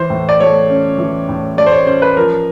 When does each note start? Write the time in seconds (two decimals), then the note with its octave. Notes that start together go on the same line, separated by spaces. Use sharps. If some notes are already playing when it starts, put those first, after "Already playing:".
Already playing: E3 C5
0.10 A2
0.29 D5
0.40 A3 C#5
0.70 C#4
0.99 E3
1.29 A2
1.57 A3 D5
1.66 C5
1.72 C#5
1.87 C#4 C5
2.02 B4
2.16 F3 A#4